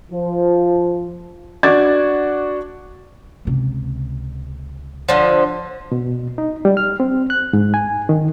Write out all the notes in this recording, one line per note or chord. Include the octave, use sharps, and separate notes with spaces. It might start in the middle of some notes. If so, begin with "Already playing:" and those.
F3
D4 F#4 D6 G#6 A6
C#2 C3
D3 F3
B2
D#4
G3
F6
C4
F#6
G#2
G#5
D#3